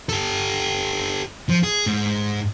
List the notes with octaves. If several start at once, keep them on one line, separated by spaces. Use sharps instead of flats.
G4 A4
F3
G#4
G#2